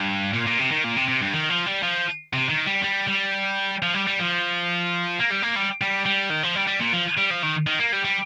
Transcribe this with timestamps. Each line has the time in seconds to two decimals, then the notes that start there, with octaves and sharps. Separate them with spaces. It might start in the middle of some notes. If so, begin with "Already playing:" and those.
Already playing: G2
0.34 A#2
0.47 A#2
0.59 C3
0.71 D#3
0.84 A#2
0.96 C3
1.08 C3
1.22 G2
1.34 D#3
1.50 F3
1.66 G3
1.83 F3
2.33 C3
2.49 D#3
2.66 G3
2.83 G3
3.07 G3
3.82 F3
3.94 G3
4.07 G3
4.19 F3
5.20 A#3
5.31 G3
5.43 A#3
5.56 G3
5.81 G3
6.06 G3
6.30 D#3
6.43 F3
6.55 G3
6.67 G3
6.80 A#2
6.93 F3
7.17 G3
7.30 F3
7.42 D#3
7.67 D#3
7.80 A#3
7.93 G3
8.05 G3